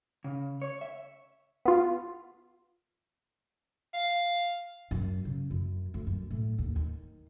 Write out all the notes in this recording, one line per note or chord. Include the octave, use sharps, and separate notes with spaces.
C#3
C#5
E5
B3 F4
F5
F#2
C#3
F#2
D2
F#2
A2
D#2
D#3